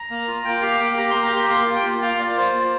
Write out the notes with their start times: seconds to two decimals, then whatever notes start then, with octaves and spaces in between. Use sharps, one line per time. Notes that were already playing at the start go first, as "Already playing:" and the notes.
Already playing: A#5
0.10 A#3
0.28 F4
0.45 A#3 G5
0.62 G4 F5
0.80 A#3 G5
0.97 G4 A#5
1.10 A#3 C6
1.23 A#5
1.32 G4 C6
1.49 A#3 C6
1.66 F4
1.76 G5
1.84 A#3
2.01 F4 F5
2.19 A#3 D5
2.36 F4 C5
2.54 A#3